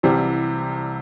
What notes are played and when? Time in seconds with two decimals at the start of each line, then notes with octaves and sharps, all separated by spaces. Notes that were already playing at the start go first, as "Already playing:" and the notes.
0.03 C2 C3 E3 G3